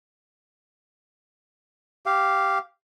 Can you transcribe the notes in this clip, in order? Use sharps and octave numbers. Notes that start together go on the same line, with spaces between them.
G4 F5